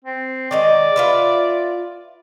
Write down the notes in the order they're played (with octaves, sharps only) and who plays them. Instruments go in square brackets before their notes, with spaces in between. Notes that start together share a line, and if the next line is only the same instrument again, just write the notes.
[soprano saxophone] C4
[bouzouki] D#3 G#3 D#5 [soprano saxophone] D5
[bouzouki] F4 B4 E5